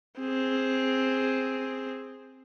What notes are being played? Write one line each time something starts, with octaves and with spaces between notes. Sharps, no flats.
C4 G#4